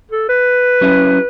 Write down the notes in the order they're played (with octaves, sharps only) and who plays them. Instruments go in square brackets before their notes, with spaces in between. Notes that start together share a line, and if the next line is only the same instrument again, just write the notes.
[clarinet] A4
B4
[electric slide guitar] F#3 C#4 E4 G#4